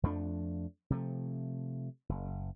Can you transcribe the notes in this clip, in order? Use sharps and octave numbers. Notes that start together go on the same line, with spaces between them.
F2 F3 A3 D4
C3 F3 A3
F#1